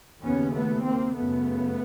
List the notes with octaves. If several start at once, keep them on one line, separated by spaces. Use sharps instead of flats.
D#2 C#3 B3 C#4
A3 B3
A#3 C4
F#2 C#3 A3 B3